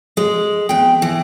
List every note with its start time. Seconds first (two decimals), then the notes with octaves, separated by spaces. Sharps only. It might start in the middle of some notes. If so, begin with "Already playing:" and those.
0.17 G#3
0.69 E2 G5
1.02 E3